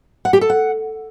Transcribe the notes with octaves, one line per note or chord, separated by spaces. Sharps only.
F#5
G4
A4
F#5